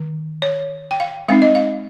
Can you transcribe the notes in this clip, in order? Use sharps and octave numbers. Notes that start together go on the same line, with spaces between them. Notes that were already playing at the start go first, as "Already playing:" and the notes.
Already playing: D#3
C#5
G5
F5
G#3 C4 D#4 F5
D#5
F5